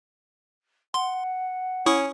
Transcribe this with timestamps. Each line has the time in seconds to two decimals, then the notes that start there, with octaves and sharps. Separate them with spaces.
0.94 F#5 C6
1.86 C#4 E4 C#6 D#6